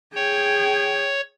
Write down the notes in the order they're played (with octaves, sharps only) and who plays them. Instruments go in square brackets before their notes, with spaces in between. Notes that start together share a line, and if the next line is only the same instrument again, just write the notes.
[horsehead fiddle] G#4 G5 [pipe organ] C#5